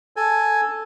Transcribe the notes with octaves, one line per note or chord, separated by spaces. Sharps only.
A4 G#5